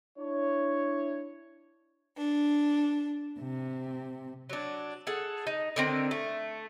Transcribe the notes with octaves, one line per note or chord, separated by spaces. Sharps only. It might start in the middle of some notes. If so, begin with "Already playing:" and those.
D4 E4 C#5
D4
C3
F#3 D4
G#4 A4 F#5
D#4
D3 D#3 C4
A3